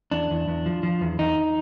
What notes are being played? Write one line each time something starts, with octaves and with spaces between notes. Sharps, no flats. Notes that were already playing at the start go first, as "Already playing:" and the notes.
E2 D4
E2
E2
F3
F3
E2
E2 D#4